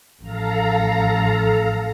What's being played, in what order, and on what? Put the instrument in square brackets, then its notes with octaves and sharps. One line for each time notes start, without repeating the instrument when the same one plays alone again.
[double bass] A1 F3 [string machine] A4 F5 A#5